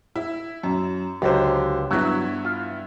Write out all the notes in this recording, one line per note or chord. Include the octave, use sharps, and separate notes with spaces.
E4
F#2
C#2 D3 F#3 G4 C5
G2 F#3 B3 E4
F4